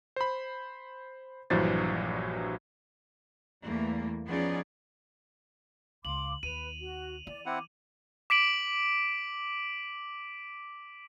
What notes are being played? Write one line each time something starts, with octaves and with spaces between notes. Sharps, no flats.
C5 B5
A#1 G2 E3 F#3 C5 A6
E2 E3 G3 A3 A#3
F3 B3 C#4 D#4 G#4 D5
C#2 F5 C6 D6 F#7
D#2 B4 D#7 F7
F#4
E3 D5
C4 E4 F#5 D6
D6 B6 D7 F#7